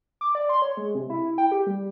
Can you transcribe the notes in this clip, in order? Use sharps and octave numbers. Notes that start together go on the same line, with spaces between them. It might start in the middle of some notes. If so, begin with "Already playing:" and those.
D6
D5
C6
C#5
G#3
C3
E4
E4
G5
G4
G3